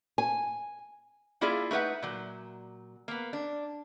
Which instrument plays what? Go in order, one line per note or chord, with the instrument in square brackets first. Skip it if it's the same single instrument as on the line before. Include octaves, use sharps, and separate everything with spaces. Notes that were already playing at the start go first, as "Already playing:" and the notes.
[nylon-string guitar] G#5
[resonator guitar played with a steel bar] A#3 E4 F4 G#4 D5 E5
A3 D#4 B4 E5 F#5
A#2 F#3
A#3 B3
D4